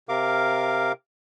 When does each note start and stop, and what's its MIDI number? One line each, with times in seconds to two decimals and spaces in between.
0.09 0.92 48
0.09 0.92 70
0.09 0.92 77
0.09 0.92 86